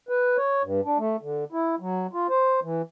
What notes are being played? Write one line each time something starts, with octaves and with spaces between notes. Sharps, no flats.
B4
C#5
G2
D4
A3
D3
E4
F#3
F4
C5
E3